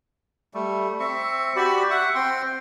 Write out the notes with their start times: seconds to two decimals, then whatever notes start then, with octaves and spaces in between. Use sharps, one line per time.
0.54 G3 A3
1.00 C4 E5 C#6
1.56 F#4 G4 D5 B5
1.90 E5 F#5 C#6
2.15 C4 G5 C6